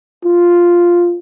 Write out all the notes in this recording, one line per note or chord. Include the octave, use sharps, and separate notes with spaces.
F4